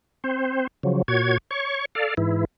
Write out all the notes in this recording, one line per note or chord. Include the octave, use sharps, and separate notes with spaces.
C4 C5
C#3 F3 F#3
A#2 F#4 C#5 G#6
C#5 C#6
A4 D5 F5
G#2 E3 E4